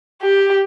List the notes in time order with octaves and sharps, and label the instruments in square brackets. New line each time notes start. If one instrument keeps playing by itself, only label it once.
[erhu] G4